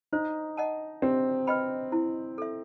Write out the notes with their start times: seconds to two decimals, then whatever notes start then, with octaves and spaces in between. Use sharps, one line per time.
0.12 D#4 C5
0.57 D#5 F#5 A5
1.02 C4 G4
1.47 B4 D#5 G5 B5
1.92 E4
2.38 A4 E5